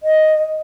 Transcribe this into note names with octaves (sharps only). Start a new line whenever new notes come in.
D#5